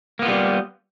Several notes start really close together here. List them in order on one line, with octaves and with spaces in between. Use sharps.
A#3 B3 F4 G3